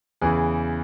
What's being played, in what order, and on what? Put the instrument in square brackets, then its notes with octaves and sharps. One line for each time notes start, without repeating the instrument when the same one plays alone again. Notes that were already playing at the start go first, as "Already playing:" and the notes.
[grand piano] E2 C#3 E3 G#4 B4